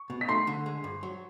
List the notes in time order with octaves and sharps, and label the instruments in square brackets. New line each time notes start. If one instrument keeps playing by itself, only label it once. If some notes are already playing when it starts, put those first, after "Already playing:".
Already playing: [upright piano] C#6
[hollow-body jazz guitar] B2
[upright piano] B6
[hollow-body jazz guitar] A3 [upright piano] C6 C7
[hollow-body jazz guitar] D3
G#3
G2
F#3